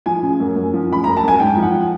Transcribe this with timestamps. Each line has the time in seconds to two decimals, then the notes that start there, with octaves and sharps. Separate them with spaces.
0.06 F3 G#5
0.23 C#3
0.40 F#2
0.56 F#2
0.74 F3
0.89 C#3 B5
1.04 F#2 A#5
1.17 A5
1.23 F#2 G#5
1.40 G#2 G5
1.57 F3
1.63 F#5